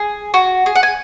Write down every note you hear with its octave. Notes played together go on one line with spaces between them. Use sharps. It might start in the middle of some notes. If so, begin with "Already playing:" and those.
Already playing: G#4
F#4
G#4
F#5
G#5